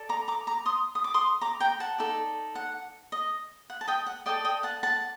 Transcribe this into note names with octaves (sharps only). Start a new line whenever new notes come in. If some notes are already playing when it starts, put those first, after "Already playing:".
Already playing: A4 D5
A#5 D6
A#5 D6
A#5 D6
C6 D#6
D#6
D6
C6 D#6
A#5 D6
G5 A#5
F#5 A5
D#4 A4 D5
F#5
D#5
F#5
A5
D#5 G5
F#5
A4 D5 D#5 G5
D#5 G5
F#5 A5
F#5 A5